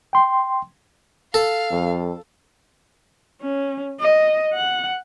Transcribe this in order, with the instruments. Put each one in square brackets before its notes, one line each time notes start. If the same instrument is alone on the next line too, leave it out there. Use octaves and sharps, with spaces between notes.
[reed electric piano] G5 C6
[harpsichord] A4 [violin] F5
[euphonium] F2
[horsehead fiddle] C#4
D#5
F#5